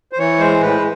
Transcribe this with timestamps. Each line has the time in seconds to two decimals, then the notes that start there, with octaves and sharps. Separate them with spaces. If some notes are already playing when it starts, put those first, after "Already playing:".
0.13 C5
0.18 E3 C#5
0.39 G#3 C5
0.60 A2 B4